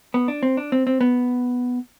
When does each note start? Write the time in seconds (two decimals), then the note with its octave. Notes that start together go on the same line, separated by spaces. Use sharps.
0.14 B3
0.28 D4
0.43 C4
0.57 D4
0.72 C4
0.87 C4
1.01 B3